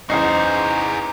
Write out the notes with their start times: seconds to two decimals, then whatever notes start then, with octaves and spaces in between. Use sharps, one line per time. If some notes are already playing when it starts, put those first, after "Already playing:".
0.10 E2 C#4 D#4 F#4 G#4 C5 A#5 C7